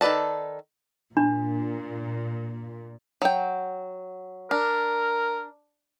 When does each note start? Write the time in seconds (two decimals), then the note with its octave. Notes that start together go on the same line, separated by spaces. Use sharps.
0.01 D#3 A4 B4 D5 A5
1.17 A#2 D4
3.22 F#3 G5
4.51 D4 A#4